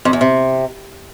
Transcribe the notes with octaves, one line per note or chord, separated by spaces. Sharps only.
F2
E2
C3